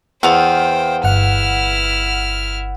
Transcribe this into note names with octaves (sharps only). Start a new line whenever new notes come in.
E2 B3 C5 F5 G5
G1 E4 F#5 F6